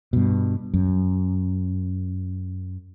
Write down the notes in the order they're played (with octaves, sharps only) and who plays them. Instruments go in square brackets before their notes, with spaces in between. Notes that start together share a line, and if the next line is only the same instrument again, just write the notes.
[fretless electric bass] G2 B2
F#2